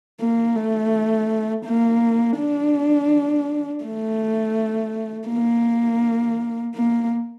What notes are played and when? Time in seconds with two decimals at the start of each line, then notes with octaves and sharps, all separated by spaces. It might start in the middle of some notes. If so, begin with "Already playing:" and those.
0.20 A#3
0.56 A3
1.65 A#3
2.38 D4
3.84 A3
5.29 A#3
6.75 A#3